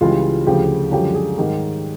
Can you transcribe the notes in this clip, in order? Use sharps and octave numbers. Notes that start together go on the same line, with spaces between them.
C#2 C#3 E3 G3 F4
D2 C#3 F3 G4
F#2 D3 F3 G#3 G4
G#4
G#2 D#3 G3 G4